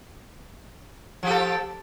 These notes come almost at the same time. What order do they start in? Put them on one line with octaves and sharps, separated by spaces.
F3 G4 A4